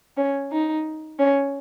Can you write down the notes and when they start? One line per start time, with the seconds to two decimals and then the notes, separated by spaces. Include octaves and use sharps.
0.17 C#4
0.51 D#4
1.19 C#4